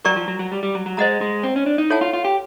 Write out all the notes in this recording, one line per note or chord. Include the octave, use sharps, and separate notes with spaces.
F#3 A#4 D5 G5 A#5 C#6
F3
F#3
F#3
G3
G3
F#3
F#3
G#3 C5 D#5 F#5 A#5
G#3
C4
C#4
D4
D#4
E4 A4 C#5 F#5 A5
F4
F4
G4